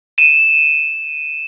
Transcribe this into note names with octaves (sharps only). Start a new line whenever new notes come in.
D#7 E7